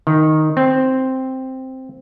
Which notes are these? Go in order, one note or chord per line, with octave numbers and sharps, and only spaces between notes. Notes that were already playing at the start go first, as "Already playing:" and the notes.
D#3
C4